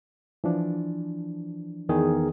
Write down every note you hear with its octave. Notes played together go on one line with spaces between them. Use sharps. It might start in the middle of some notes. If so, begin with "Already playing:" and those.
E3 F3 D4
E2 D#3 G#4